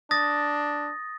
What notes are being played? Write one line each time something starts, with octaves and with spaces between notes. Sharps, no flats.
D4 D#6 A6 A#6